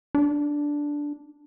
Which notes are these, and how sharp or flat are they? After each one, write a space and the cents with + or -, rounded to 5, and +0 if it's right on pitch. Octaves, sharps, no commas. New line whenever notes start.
D4 -5